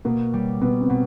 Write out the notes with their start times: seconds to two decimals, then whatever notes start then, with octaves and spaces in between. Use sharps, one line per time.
0.05 B2 A#3
0.34 G3
0.61 B2 B3
0.81 C4
0.90 B2